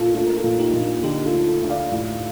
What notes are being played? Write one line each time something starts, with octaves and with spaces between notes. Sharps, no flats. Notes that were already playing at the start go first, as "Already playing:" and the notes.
Already playing: A#2 D#4 F4 A4
A3 D4 F4
A#4
F4 A4
A#2
D#4 G4
A#2
D4 F4
D3 D#4 G4
F4 A4
D2
F4 A4
D2
D5 F5
A2